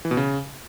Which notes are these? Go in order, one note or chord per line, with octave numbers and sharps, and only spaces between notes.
E3
B2
C#3